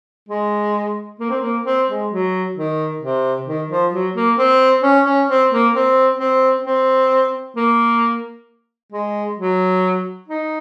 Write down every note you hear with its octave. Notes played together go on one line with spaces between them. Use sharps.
G#3
A#3
C4
A#3
C4
G#3
F#3
D#3
C3
D#3
F3
F#3
A#3
C4
C#4
C#4
C4
A#3
C4
C4
C4
A#3
G#3
F#3
D#4